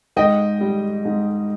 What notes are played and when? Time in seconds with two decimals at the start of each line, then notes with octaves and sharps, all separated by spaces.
0.16 G#2 D#5 G5
0.61 G3
1.05 G#2